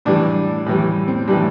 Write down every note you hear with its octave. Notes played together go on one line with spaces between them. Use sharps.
A2 E3 G3 D4
A2 E3 G3
C4
A2 E3 G3 D4